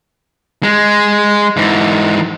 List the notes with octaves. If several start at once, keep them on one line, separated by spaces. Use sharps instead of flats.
G#3
G#2 E3